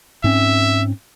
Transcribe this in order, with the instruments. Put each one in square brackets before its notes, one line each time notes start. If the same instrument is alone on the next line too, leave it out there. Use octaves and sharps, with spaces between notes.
[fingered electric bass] G#2 C4 C#4 [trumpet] E5